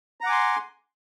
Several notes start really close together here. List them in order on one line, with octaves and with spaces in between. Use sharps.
A#5 F#5 D6 G#5 C6